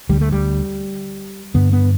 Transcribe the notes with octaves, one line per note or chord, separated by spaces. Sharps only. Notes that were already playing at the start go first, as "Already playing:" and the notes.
D2 D3 G3
A3
G3
G2 D3 B3
B3